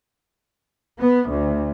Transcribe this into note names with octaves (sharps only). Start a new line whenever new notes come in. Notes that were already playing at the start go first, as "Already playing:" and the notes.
B3
D2